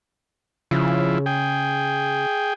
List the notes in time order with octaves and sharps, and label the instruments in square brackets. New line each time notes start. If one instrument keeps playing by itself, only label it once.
[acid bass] C#3 [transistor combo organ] F3 E4
[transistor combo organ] G#4 G5